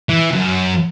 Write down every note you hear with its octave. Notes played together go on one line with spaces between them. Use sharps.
E3
C#2 F#2